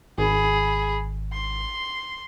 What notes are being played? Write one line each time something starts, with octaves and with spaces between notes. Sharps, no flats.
G#1 G#4 B5
C6